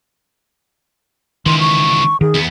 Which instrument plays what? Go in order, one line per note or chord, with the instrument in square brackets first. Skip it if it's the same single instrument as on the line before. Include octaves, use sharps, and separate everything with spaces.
[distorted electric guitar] C#2 E3 [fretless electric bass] D#3 [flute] C6
[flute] C#6
[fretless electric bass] D#3 [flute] G#4
[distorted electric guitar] E2 B3